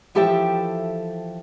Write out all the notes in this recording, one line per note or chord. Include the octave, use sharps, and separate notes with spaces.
E3 F3 G4 A4 E5 G5